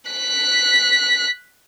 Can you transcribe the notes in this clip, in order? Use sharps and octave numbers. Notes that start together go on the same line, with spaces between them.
F#6 B6